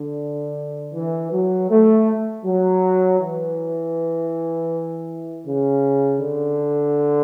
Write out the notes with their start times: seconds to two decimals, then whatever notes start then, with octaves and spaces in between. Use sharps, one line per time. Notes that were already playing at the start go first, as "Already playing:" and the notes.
Already playing: D3
0.94 E3
1.32 F#3
1.70 A3
2.45 F#3
3.20 E3
5.45 C#3
6.20 D3